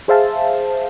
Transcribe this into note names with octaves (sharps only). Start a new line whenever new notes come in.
G#4 C5 E5 F5 A5